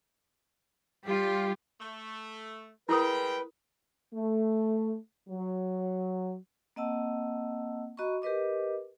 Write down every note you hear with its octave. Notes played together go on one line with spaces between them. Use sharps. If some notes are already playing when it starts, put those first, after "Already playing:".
G3 F4 G4
A3
G3 G#3 E4 A#4 B4 G5 D#6
A3
F#3
A#3 C4 D#5 F#5 A5 E6
F#4 D#5 A#5 B5 C#6
G4 A#4 B4 D#5 D6